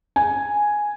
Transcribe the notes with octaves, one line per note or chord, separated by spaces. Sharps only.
G#5